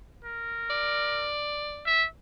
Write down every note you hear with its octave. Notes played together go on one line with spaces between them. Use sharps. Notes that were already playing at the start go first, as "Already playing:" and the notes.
A#4
D5
E5